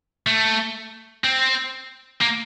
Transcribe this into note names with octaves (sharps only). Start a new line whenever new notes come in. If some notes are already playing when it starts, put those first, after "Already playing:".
A3
C4
A#3